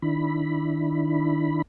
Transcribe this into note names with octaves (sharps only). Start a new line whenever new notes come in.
D#3 D4 E4 B5